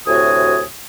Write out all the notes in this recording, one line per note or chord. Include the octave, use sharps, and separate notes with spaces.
D2 A2 C3 F#4 G#5 D#6